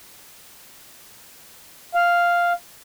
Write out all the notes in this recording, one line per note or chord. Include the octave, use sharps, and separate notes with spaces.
F5